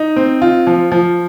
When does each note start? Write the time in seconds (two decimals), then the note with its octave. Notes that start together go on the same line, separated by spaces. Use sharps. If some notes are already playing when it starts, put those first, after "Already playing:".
Already playing: D#4
0.16 C4
0.42 F4
0.67 F3
0.92 F3